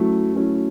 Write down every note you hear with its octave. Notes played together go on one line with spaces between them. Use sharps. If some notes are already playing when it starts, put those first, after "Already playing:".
Already playing: F#3 A3 C#4 E4
F#3 A3 C#4 E4